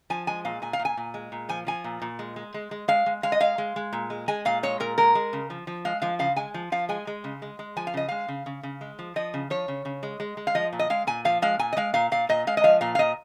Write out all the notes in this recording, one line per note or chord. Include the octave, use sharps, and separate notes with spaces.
F3 G#5
G#3 G#5
A#2 F5
A#2 G#5
F5
A#2
G#5
A#2
G#3
A#2
F3 G#5
F3 G#5
A#2
A#2
G#3
G#3
G#3
G#3
G#3 F5
G#3
G#3 F5
D#5
G#3 F5
G#3
G#3
A#2
G#3
G#3 G#5
A#2 F5
G#3 C#5
A#2 A#4
G#3 A#4
G#3
C#3
F3
F3
G#3 F5
F3 F5
C#3 F5
G#3 G#5
F3
F3 F5
G#3 G#5
G#3
C#3
G#3
G#3
F3 G#5
F5
C#3 D#5
G#3 F5
C#3
C#3
C#3
G#3
F3
F3 D#5
C#3
F3 C#5
C#3
C#3
G#3
G#3
G#3
F5
F3 D#5
A#2
D#5
G#3 F5
A#2 G#5
F3 F5
G#3 F5
A#2 G#5
D#5
G#3 F5
A#2 F5
A#2 F5
A#2 D#5
G#3 F5
D#5
F3 F5
A#2 F5
F5
A#2 D#5